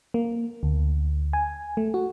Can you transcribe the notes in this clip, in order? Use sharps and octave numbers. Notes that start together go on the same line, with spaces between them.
A#3
D2
G#5
A3
F#4